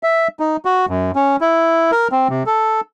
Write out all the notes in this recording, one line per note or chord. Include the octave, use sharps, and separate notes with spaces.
E5
D#4
F#4
F#2
C#4
E4
A#4
C4
C3
A4